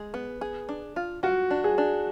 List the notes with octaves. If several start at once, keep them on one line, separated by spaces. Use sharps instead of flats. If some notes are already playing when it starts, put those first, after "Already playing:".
Already playing: G#3 G#4
B3
G#4
D4
F4
F4 F#4
D4
G#4
D4